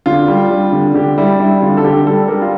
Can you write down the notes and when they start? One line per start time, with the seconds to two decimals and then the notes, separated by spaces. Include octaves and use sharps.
0.06 D3 F4
0.28 G3
0.51 G3
0.72 D3
0.94 D3 G4
1.18 G3 E4
1.40 G3 E4
1.62 D3 F4
1.77 A4
1.84 D3 G4
2.06 G3 A4
2.28 G3 A#4
2.42 F4